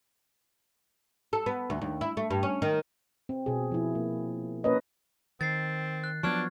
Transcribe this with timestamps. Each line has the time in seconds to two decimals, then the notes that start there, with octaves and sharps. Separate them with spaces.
1.33 A4
1.46 B3
1.70 D2
1.82 D#2
2.01 E4
2.17 A3
2.30 G2
2.43 C#4
2.62 D#3
3.29 C4
3.46 B2 G#4
3.72 F3 E4
3.95 A#3
4.64 A#3 C#4 A#4 B4 C#5 D#5
5.41 D#3 C4 A6 C7
6.04 F#6
6.23 F3 F#3 B3 D4 C#6 F6 G#6